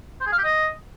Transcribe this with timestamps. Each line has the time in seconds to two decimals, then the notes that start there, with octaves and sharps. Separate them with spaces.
0.21 C5
0.27 G#4
0.32 F5
0.38 G4
0.44 D#5